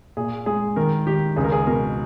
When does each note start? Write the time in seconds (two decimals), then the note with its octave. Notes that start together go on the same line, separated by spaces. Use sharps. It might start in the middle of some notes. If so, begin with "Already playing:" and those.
0.17 A#2 G#4
0.46 G#3 G#4
0.76 D#3 A#4
1.07 D#3 G4
1.36 C#2 G#4
1.44 A#4
1.52 G#4
1.67 B2 A#4